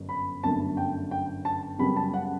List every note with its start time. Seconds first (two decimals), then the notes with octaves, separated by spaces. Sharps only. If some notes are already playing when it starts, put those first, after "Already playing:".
Already playing: G1 F#2
0.09 B5
0.43 G1 F#2 D3 A3 A5
0.77 G5
1.11 G5
1.45 A5
1.79 F#2 C#3 G3 B3 B5
1.96 A5
2.14 F#5